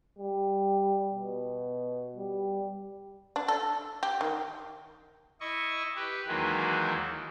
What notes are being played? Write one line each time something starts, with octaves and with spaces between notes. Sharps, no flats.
G3
B2
G3
D4
A4
G4
D#3
E4 D#5 C#6
G4 B4
D#2 D#3 E3 F#3 G#3 A#3